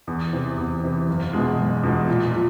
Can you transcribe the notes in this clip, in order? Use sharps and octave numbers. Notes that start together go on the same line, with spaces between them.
E2
C3 E3
E2
C3 E3
F#1
E2 B2 G#3
F#1
E2 B2 G#3
A#2
F3